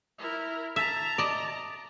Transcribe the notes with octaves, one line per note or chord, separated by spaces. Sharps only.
E4 A#4
E5 A5 A#5
D5 D#5